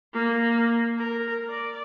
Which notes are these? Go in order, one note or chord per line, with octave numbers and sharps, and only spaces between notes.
A#3
A#4
D5